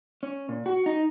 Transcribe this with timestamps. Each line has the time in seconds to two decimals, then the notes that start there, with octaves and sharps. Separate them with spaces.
0.23 C#4
0.49 A#2
0.66 F#4
0.86 D#4